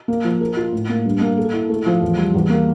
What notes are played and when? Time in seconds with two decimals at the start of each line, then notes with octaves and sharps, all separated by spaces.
0.08 A#3
0.25 F3
0.41 A#4
0.57 F4
0.73 A2
0.89 A#3
1.05 G2
1.21 A#3
1.38 A4
1.54 E4
1.70 A3
1.86 F3
2.02 E2
2.18 G3
2.34 E2
2.50 A#3